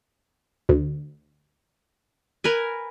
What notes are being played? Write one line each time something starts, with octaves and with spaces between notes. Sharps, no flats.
D2
A#4 B4 G#5